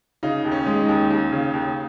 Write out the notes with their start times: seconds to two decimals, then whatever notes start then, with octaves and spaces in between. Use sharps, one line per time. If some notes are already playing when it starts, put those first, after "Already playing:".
0.23 C#3 D#4
0.45 D#2
0.52 C#4
0.67 G#3
0.81 D#4
0.89 D#2
1.10 D#2
1.32 C#3
1.54 D#2